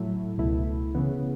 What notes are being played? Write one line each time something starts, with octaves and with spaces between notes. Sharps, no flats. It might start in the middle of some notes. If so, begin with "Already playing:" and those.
Already playing: A2 F#3 A3 E4
C#2 B2 A3 E4
C#3 E3 B3